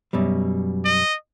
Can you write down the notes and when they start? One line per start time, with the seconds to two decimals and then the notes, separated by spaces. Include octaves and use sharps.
0.13 F#2 B2 G3
0.85 D#5